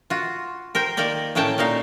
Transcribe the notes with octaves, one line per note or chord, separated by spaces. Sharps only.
F4 F#4
A#4 C5 G5
D#3 A#3 A#4 D5 G5
A2 A#3 C#4 G5 A5
A#2 A#3 D#4 F5